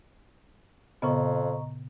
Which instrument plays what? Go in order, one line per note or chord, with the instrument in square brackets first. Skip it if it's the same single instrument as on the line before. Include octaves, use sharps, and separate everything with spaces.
[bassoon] F2 [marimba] A#2 C#3 B3 [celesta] D#5 A#5 C#6